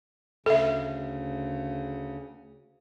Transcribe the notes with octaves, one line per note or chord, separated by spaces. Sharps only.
D2 C#3 A4 E5